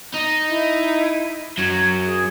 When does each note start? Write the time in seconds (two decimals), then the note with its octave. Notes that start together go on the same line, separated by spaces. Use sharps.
0.14 D#4
0.49 E4
1.58 F#2 F#3 G#6
2.05 G#4